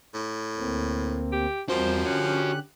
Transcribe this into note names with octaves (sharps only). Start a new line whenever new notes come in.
A2
D2 A#3 C4
G4
E2 F3 G3 C4 F#4 A#4 C5
D3 C#4 G4 F#6